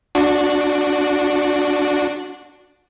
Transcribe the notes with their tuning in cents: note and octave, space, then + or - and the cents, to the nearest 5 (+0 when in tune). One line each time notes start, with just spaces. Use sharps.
D4 +0 F#4 -15